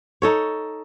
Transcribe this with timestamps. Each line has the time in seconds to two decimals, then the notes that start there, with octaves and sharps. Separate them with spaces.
0.22 D#4 A4 C#5